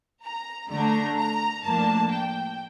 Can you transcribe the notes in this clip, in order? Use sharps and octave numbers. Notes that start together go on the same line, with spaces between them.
A#5
D3 A3 D4 A#5
A#5
A2 F3 A#3 D4 A5
G5